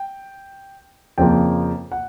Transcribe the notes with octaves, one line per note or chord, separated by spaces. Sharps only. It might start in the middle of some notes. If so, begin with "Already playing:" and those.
Already playing: G5
F2 C#3 F3 A#3 G5
F#5